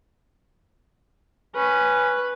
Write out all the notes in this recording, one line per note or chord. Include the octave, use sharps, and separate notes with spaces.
C#4 B4